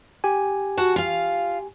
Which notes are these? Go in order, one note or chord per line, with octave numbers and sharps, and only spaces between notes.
G4 G#5
F#4 F#5 A5
F4 F5